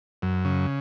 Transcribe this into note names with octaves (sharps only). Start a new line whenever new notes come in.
F#2
C#3